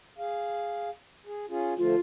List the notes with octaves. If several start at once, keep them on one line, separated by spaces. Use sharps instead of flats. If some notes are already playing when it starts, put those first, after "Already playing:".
G#4 F5
G#4
C#4 F4 G#4
D3 F3 A3 F4